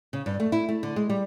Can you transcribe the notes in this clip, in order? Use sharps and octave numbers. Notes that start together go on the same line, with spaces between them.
C#3
G2
A3
E4
A3
D3
G#3
G3